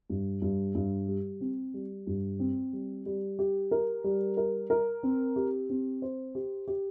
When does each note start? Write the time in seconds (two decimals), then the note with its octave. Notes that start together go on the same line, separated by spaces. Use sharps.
0.10 G2
0.42 G2
0.75 G2
1.08 G3
1.41 C4
1.74 G3
2.07 G2
2.39 C4
2.73 G3
3.06 G3
3.39 G4
3.71 A#4
4.04 G3
4.37 A#4
4.70 A#4
5.03 C4
5.36 G4
5.69 C4
6.02 C5
6.35 G4
6.68 G4